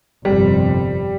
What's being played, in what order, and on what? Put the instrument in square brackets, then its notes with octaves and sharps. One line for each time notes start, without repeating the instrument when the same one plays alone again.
[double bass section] G1 F2 C3 [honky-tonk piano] G3